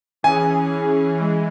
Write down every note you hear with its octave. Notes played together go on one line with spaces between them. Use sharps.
E3 C#4 G#4 G#5
E3 G#3